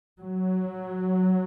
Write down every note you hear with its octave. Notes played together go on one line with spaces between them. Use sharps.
F#3